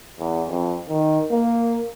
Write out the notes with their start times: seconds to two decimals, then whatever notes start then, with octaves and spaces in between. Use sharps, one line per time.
0.20 E2
0.49 F2
0.89 D#3
1.31 A#3